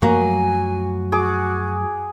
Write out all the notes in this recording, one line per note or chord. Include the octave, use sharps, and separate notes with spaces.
F#2 F3 F#3 A3 A#3 F#4 G#5
F#4 G#4 D6